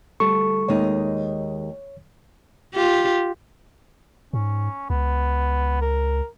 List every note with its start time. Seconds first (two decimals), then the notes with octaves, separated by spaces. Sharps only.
0.20 D2 G3 A4 C#6
0.68 D#2 G#3 D#4 C#5
2.74 F4 G4
4.33 G#2 C#4
4.90 C#2 B3
5.81 A#4